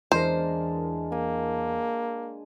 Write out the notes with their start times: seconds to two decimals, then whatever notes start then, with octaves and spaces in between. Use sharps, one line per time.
0.12 E2 E3 G#3 D4 G#4 A#4 C5
1.12 A#3 G#5